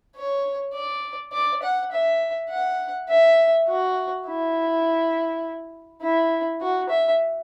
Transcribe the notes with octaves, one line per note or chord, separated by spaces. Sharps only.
C#5
D5
D5
F#5
E5
F#5
E5
F#4
E4
E4
F#4
E5